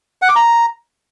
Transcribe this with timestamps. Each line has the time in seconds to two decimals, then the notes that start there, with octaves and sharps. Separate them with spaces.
0.22 F#5
0.29 D6
0.36 A#5